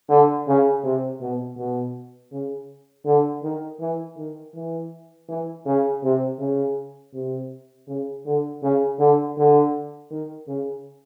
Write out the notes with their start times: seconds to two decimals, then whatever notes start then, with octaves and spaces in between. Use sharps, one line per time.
0.09 D3
0.47 C#3
0.84 C3
1.21 B2
1.57 B2
2.32 C#3
3.05 D3
3.43 D#3
3.80 E3
4.17 D#3
4.55 E3
5.29 E3
5.66 C#3
6.03 C3
6.39 C#3
7.14 C3
7.88 C#3
8.25 D3
8.63 C#3
8.99 D3
9.37 D3
10.10 D#3
10.47 C#3